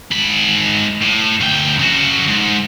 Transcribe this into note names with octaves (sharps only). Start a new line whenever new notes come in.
G#2 B5
A2
D2 G5
C#3 F#4
G#2